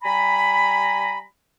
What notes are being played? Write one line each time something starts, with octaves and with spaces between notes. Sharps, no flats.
G3 G#5 A#5 B5